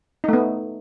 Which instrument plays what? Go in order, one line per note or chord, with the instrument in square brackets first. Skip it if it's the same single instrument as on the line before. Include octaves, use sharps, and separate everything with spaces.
[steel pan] D#4
A3
B3